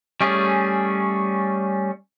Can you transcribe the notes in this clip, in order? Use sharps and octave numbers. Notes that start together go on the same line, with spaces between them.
G3 A3 C#4 G#4